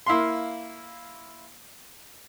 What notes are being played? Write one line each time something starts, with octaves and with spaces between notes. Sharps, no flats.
A#3 E4 F5 C6